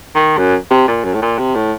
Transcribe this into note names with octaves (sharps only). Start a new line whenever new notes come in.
D#3
F#2
C3
A#2
F#2
A2
A#2
C3
A2